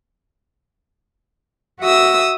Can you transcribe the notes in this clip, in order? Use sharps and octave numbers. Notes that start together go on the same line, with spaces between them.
F#4 E5 D#6 E6